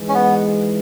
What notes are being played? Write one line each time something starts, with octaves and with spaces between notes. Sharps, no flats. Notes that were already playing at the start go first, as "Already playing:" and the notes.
Already playing: G#2 E3 G#3
C#4
B3